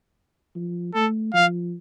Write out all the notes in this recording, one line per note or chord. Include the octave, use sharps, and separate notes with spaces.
F3
A3 A4
F3 F5